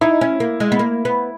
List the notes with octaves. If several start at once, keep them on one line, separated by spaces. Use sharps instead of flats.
D#4 E4
C#4
A#3
G#3
B3
A#3
B3